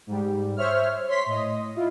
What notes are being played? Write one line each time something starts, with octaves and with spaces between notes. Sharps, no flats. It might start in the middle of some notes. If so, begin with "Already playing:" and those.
G#2 G3
C5 C#5 E5 F6
C#5 C6 B6
A2 D#5
E4 F4